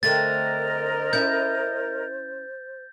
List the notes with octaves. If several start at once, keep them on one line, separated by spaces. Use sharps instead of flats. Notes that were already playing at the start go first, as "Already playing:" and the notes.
D3 A3 C4 A#4 C5 D#5 A6
C#4 E4 G6